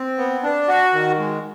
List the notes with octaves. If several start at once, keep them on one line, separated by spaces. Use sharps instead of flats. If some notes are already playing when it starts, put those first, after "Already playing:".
Already playing: C4
B3
D4
F#4
D#3
G#3